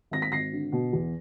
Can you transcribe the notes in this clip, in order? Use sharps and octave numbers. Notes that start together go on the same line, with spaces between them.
G#1 A#6
B6
G#1 A#6 C7
D3
B2
E2